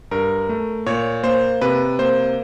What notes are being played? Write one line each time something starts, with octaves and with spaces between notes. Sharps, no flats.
G2 A#4
A3
A#2 C#5
A#3 C5
C3 B4
A#3 C5